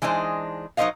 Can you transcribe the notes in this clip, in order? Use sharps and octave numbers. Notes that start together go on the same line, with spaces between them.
E3 G#3 D4 D#4 C5
F#3 D#4 A#4 C5 D#5 F5